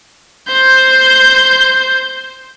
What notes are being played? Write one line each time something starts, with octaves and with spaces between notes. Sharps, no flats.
C5 G6